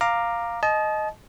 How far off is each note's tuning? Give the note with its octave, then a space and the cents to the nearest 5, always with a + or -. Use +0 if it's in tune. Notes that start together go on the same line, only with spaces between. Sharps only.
F5 +0 A#5 +0 D6 +10
D#5 +0 A5 -35